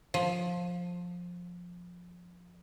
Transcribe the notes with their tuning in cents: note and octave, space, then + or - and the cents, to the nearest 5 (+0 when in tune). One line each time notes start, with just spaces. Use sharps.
F3 +15